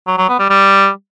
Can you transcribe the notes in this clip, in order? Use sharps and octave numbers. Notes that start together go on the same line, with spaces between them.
F#3
F#3
B3
G3
G3